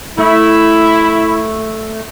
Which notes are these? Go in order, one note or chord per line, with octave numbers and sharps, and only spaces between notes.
A3 E4